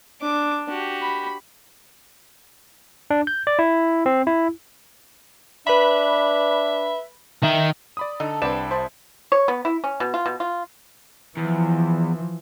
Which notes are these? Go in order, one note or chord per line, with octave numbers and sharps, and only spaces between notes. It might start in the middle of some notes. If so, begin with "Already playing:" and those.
D4 D6
F#4 G4
B5
D4
G6
D5
E4
C4
E4
D4 B4 E5 B5
D#3 E5
D5 B5 D#6
D3 D#4 A4
C2 C4 D4 B4 D5 E7
E4 C5 D#5 A5
C#5
B3
E4
C#4
B2
F4
B2
F4
E2 E3 F3